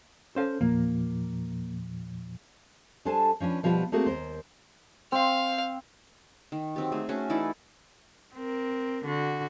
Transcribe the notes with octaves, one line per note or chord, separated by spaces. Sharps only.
C#4 A4 C5 F5
E2 A#2 F3 A#3
G3 D4 A4 C5 G#5 A5
F3 C#4 D4 B4
B2 F3 G3 F4 A#4 B4
A3 A#3 C4 F#4 G#4 A#4
D#2 A#4 C5
C4 F5
D#3
F#3 C4 G4
A3 G#4
A3 C#4 F#4 G#4
E3 D#4 E4 D5
C4 A#4
D3 F#4